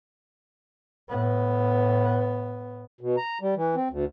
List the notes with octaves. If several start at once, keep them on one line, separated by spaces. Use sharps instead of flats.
A2 B3
B2
A#5
G3
E3
C4
D2